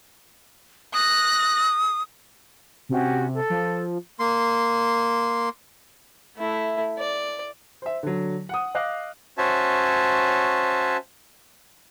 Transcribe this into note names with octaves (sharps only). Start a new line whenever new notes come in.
D#6 F#6 A#6
C3 C#4 F#4 G4
A4
F3
A#3 C6
A3 E4
D5
C5 E5
D3 F#3
F#5 D#6
D#5 F5 D6 F#6
C#4 F#4 C5 C#5 E5 A5